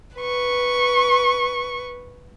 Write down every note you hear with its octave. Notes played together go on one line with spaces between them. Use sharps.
B4 C#6